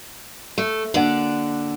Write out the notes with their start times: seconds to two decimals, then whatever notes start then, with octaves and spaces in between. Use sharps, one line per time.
0.58 A3
0.94 D3 A#3 D5 F#5